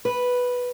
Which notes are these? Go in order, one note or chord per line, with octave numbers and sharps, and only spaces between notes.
B4